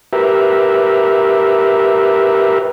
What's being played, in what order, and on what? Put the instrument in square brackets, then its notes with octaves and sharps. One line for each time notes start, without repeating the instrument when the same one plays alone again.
[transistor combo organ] G4 A#4 B4 E5